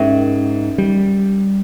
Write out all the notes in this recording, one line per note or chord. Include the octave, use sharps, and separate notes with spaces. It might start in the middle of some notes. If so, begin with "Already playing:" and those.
Already playing: G#2 C#4 G4 A#4 E5
G3